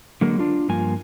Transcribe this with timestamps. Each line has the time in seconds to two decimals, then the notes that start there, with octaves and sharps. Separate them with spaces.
0.21 D3 F#3 G#3 A#3 A#4
0.39 D4 F4
0.69 G2 F3 A#3 G#5